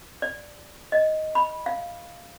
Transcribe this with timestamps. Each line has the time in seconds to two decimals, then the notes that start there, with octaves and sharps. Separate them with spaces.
0.22 D5
0.92 D#5
1.35 B5
1.66 F5